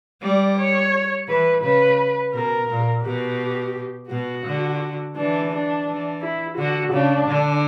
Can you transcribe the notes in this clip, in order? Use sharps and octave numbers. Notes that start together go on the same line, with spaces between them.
G3 D5
C#5
E3 B4
C#3 B4
B2 A#4
A#2
B2 G4
B2 F#4
D3
E3 D4
D4
E3
E4
D3 F#4
C#3 D4
D3